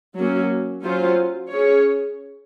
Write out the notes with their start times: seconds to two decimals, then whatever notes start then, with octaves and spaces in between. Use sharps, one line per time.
0.16 F#3 A#3 C#4 F#4
0.83 F#3 C#4 F4 C5
1.49 C#4 G#4 C#5